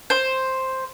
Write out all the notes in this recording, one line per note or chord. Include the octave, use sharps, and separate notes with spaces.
C5